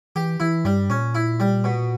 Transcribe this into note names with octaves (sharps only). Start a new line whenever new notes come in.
E3 G4
E3 E4
G2 G3
A#2 C#4
E4
G3
B2